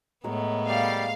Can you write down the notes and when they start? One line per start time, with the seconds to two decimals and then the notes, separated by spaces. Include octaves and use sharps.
0.24 A2 G#3 B3 A#4 C#5
0.67 G3 F5